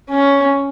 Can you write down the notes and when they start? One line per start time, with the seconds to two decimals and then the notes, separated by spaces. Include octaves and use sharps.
0.10 C#4